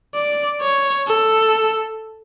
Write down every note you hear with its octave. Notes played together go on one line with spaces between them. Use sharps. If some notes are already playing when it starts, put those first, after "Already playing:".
D5
C#5
A4